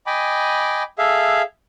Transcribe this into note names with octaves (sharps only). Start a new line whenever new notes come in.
D#5 G5 G#5 B5 D6
G#4 A4 E5 F5